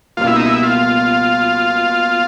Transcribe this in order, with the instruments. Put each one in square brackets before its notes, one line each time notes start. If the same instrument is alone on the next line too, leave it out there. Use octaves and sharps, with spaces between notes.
[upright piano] C#2 B2 G3 A#3 [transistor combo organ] F4
[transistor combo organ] E4
D#4
E4
F4